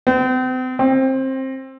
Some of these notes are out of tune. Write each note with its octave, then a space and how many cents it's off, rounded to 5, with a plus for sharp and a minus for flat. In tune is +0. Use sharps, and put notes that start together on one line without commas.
C4 -40
C4 +20